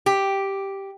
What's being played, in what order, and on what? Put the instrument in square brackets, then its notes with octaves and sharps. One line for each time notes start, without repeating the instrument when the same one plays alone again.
[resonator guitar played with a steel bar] G4